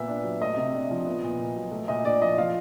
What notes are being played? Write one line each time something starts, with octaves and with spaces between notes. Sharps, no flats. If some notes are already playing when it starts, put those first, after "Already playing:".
Already playing: A#2 B3 E5
D4
F#3
A3 D#5
C3
D4
F3
B3
A#2
A#2
F#3
A3
A#2 D#5
D4 D5
F3 D#5
F3 F5